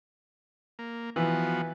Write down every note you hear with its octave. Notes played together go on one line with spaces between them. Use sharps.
A#3
E3 F3 B3 F#4